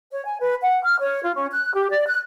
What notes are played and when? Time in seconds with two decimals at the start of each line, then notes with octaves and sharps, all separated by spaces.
0.11 C#5
0.24 G#5
0.40 B4
0.62 F#5
0.83 F6
0.99 C#5
1.23 F4
1.35 C#4
1.51 F#6
1.74 G4
1.89 D5
2.06 F#6